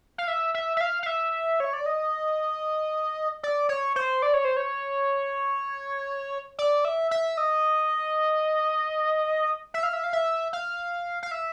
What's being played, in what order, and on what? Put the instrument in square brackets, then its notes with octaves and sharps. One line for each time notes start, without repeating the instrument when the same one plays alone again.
[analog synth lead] F5
E5
E5
E5
F5
F5
E5
C#5
D5
D#5
D5
C#5
C5
D5
C#5
C5
C#5
D5
E5
E5
D#5
E5
F5
E5
F5
E5
F5
F5
E5